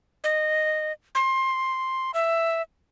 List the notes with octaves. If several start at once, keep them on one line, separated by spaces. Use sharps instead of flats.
D#5
C6
E5